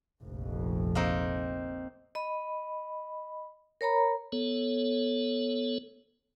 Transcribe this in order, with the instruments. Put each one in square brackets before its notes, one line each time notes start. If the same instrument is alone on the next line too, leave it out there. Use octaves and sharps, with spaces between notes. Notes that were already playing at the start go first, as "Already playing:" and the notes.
[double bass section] F1 A#1 F2
[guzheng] A#3 C4 D#4
[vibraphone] D#5 B5
A#4 C#5 A#5 B5
[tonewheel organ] B3 A4 C#5